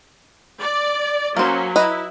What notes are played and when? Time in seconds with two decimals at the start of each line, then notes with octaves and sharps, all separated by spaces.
0.61 D5
1.37 F#3 A#3 C#4 C5
1.76 E4 B4 D#5 A#5